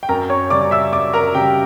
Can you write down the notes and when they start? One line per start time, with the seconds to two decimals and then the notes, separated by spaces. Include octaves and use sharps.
0.03 G5
0.09 F#2 A#4 A#5
0.30 C#5 C#6
0.50 C#3 G3 D5 D6
0.71 E5 E6
0.93 F#2 D5 D6
1.14 A#4 A#5
1.35 C#3 G3 G4 G5